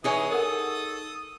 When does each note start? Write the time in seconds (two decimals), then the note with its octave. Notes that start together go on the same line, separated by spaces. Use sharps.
0.04 E3 D#4 G#4 C#5 D#6
0.31 A4 A#4 F#5